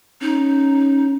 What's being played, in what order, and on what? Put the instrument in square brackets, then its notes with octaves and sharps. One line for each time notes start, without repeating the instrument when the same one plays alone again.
[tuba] C#4 [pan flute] D#4